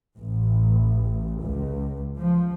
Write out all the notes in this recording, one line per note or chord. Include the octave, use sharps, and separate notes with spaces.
A1
C#2
F3